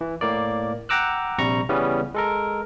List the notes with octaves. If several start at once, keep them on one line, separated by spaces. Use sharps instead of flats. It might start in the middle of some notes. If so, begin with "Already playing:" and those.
E3
A2 A#3 D5
F#5 G5 A#5 D6 E6 F#6
A#1 C3 G3 A#5 C#6
C#3 E3 G3 B3 C#4
G#3 A4 A#4